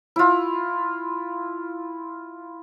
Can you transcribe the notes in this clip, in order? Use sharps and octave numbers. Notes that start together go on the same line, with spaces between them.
E4 F4